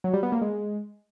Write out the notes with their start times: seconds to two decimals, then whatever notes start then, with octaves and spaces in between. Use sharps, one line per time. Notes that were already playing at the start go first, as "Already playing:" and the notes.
0.04 F#3
0.14 G3
0.23 B3
0.32 A#3
0.42 G#3